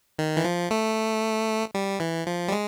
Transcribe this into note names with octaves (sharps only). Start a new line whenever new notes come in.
D#3
E3
F3
A3
G3
E3
F3
G3
G#3